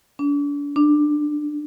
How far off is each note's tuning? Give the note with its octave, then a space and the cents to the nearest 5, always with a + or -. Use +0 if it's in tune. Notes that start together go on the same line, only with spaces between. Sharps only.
D4 -35
D4 +20